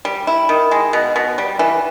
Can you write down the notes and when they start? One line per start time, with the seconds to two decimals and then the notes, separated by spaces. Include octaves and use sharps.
0.05 G3
0.27 E4
0.49 D#3
0.71 G#3
0.93 B2
1.16 B2
1.38 G3
1.59 E3